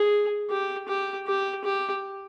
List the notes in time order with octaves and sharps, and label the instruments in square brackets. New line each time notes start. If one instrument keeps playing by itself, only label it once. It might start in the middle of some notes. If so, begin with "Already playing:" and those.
Already playing: [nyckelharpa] G#4
G4
G4
G4
G4